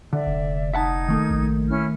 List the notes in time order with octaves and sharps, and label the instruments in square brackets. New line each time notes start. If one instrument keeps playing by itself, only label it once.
[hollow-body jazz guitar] D3 [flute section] D5 E5
[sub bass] F1
[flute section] D#4 G#6 [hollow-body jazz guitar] E5 F#5 A5
[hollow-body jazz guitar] D#3 A3 A#3
[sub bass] A#1
[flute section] C#4 E4 F6